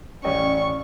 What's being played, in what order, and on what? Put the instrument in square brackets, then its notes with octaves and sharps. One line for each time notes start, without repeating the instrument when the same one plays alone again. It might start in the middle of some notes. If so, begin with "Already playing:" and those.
[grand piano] A1 D#5 G5 [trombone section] C#4 [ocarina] D5 [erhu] C#6